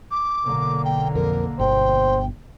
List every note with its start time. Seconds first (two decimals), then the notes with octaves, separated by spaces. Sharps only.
0.11 D6
0.44 B1 D3 A#3
0.85 G5
1.15 F2 A#4
1.59 G1 B2 C5 G5